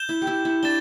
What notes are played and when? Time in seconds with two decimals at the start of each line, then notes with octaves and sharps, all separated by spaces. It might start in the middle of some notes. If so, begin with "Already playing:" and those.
Already playing: G6 E7 G7
0.09 E4
0.22 G4
0.27 E4
0.45 E4
0.63 D4 A6 E7 G7